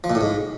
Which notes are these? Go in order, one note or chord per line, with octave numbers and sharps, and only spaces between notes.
F3
A#2
A2
G#2